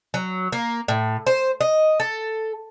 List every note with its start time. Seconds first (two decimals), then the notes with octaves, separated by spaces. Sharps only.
0.14 F#3
0.52 A#3
0.88 A2
1.27 C5
1.61 D#5
2.00 A4